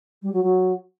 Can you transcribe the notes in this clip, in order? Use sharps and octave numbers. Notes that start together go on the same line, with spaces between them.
G3
F#3
F#3